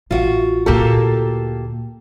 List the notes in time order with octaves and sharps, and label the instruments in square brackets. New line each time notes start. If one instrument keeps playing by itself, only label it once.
[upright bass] A1 [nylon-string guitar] F4 F#4
[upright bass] D2 A#2 [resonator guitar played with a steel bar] A#3 G4 A4